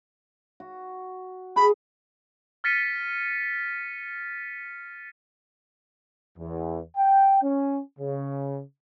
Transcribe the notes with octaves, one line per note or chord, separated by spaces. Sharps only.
F#4
G#4 B5
F6 A6 B6 C#7 D#7
E2
G5
C#4
C#3